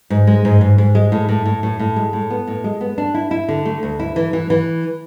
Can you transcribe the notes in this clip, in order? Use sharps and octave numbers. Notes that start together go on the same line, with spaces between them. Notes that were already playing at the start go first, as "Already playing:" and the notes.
G#2
G#3
G#2
G#2
G#2
G#3
A2
A2
A2
A2
A2
G#3
A2
B3
A2
G#3
B3
D4
E4
E4
D3
A3
D2
E4
E3
E3
E3